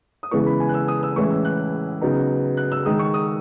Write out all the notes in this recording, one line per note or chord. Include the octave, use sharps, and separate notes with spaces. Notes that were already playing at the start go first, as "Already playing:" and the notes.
D#6
C#3 E3 G#3 B3 E4 C#6
B5
G#5
F#6
E6
D#6
E6
A2 E3 G#3 C#4 E4 C#6
E6
F#6
C#3 F#3 B3 D#4
F#6
E6
D#3 G#3 D#4 D#6
C#6
D#6